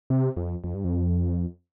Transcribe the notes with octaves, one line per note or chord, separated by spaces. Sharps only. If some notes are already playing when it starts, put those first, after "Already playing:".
C3
F2
F2
G2
F2